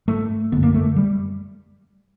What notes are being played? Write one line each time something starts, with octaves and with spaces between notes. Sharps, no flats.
G#2 A3
F#2 D3 B3
A#3
A3
G3